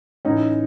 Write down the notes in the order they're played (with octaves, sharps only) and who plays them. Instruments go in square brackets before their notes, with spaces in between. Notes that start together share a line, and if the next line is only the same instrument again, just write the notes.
[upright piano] A2 E3 C#4 D#4